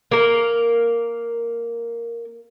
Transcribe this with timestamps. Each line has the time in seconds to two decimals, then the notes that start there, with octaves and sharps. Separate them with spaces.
0.11 A#3 A#4